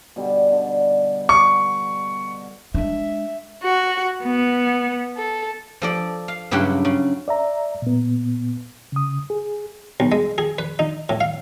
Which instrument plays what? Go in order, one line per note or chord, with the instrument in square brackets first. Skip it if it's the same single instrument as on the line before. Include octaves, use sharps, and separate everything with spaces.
[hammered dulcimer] B2 D3 G3
D3
[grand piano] C#6
[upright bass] G#3 D4 [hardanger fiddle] E5
[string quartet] F#4
B3
A4
[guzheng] F3 A4 D5
F5
G2 C#3 F#3 E4 G4 F#5
C#3
[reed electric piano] D5 E5 A#5
A#2 B3
C#3 D#6
G#4
[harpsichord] B1
G#3
G#4
B4
D#4
A2
F5